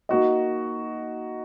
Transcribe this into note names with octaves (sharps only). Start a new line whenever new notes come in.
A#3 D#4 F#4 D#5